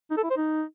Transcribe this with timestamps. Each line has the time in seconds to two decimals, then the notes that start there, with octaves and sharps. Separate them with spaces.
0.10 D#4
0.17 A4
0.24 E4
0.30 C5
0.37 D#4